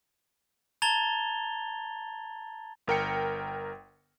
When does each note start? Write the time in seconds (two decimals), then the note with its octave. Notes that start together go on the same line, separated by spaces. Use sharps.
0.82 A5 A#5 G#6 A6 F7 G7
2.87 G1 A#4 G5 C#7